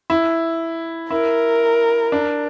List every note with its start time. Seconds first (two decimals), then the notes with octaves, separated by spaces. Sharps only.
0.10 E4
1.11 E4 A#4
2.12 D4